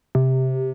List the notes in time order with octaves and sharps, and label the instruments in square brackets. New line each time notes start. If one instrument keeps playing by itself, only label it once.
[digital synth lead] C3